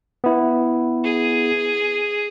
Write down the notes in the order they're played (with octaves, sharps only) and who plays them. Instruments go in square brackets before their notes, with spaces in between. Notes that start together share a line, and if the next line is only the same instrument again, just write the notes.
[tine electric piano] B3 E4
[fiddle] G#4